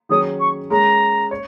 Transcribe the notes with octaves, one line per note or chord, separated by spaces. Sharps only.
D#3 F#3 C#4 G#4 C#5 D#6
C#6
G#3 C#4 A#4 A#5
C#5